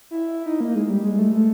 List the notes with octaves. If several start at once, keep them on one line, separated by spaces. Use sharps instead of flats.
E4
D#4
A#3
G#3
G3
G#3
A3
A3